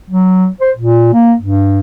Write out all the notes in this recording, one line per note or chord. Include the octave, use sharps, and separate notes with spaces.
F#3
C5
A#2
A#3
G2